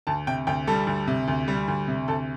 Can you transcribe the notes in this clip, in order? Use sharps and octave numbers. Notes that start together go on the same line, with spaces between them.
D2 A5
C3 G5
D2 G5
G3 A4
D2
C3
D2
G3
D2
C3
D2 A4